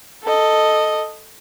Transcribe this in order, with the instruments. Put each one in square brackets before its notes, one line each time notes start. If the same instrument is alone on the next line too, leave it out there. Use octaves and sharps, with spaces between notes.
[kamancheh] A4 D#5